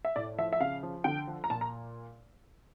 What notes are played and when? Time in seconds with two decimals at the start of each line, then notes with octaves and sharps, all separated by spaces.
0.05 E5
0.16 A2 D5
0.38 F3 E5
0.53 E5
0.60 C#3 F5
0.83 F3
1.04 D3 G5
1.27 F3
1.44 A#5
1.50 A#2 A5
1.61 A#5